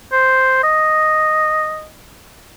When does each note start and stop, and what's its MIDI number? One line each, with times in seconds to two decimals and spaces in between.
0.12 0.61 72
0.64 1.87 75